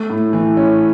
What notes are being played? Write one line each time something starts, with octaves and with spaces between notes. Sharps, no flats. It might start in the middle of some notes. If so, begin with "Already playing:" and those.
Already playing: A3
A2
E3
C#4